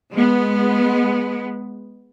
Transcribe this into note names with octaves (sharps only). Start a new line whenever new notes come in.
G#3 B3